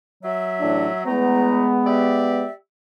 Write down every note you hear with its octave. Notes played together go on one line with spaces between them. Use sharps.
F#3 E5
A1 A2 D4
E2 G#3 A3 B3 A#5
G4 D5 E5